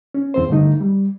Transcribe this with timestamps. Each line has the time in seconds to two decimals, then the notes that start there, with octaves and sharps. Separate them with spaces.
0.14 C#4
0.34 E2 C4 C5
0.49 G2 D3 A3 D#4
0.81 G3